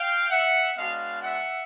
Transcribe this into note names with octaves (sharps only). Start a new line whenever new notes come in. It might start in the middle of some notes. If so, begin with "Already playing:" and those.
Already playing: F5 G5
E5 F#5
G#3 B3 D4 F#4 D#5 F5
E5 F#5